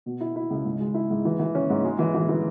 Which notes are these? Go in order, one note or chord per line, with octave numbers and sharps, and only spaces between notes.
B2
E4
E4
C#2
G#2
G#3
E4
G#2
E3
E3
C#4
G#2
G#3
E3
E3
E3